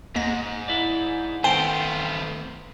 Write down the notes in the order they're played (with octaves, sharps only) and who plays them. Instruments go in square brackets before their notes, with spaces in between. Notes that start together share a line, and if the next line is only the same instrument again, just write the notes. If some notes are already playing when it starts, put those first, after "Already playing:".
[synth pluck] D#2 A#6 [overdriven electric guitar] G#2
[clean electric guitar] E4 D5
[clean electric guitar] D#3 C4 C5 [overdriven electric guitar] A3 B3 [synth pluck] G5